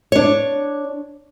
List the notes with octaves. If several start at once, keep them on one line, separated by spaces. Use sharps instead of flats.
D4 C#5